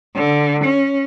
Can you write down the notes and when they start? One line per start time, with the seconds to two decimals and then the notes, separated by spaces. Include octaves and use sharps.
0.17 D3
0.65 C#4